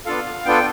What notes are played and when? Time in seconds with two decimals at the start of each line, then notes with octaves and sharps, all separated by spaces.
0.06 B3 D4 F4 A4 F5
0.45 B3 D4 F4 A4 G5